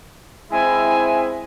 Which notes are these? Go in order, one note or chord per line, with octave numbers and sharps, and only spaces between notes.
G#3 C4 E4 G#5